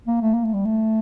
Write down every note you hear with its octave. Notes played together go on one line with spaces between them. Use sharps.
A#3
A3
A#3
A3
G3
A3